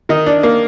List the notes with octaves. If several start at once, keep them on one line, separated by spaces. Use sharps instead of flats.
D#3 D#4
D4
A#3